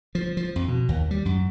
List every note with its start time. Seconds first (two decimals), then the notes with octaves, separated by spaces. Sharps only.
0.15 F3
0.37 F3
0.56 F2
0.68 B2
0.89 D#2
1.11 G3
1.25 F#2